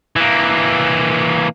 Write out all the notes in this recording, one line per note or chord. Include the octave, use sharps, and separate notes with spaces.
E3 A#3